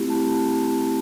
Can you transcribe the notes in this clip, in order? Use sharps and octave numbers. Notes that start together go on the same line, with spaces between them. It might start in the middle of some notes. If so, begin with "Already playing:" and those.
Already playing: A3 C4 E4 G4
A5